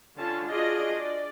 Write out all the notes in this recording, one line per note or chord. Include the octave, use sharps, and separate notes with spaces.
D3 C#4 F4 C#5 A5
D4 F4 F#4 G#4 D5 D#5
D5